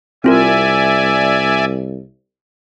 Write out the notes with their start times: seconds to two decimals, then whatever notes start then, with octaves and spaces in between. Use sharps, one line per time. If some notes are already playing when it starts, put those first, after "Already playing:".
0.24 C2 C4 F4 A#4 D5 E5 G#5